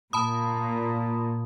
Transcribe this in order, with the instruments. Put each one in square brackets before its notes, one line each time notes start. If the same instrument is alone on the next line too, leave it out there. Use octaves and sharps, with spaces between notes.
[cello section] A#2 [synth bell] A5 B5 D#6